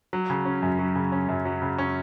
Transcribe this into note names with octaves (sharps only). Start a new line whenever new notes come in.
F#3
C#3
C#4
F#2
F#3
C#3
C#4
F#2
F#3
C#3
C#4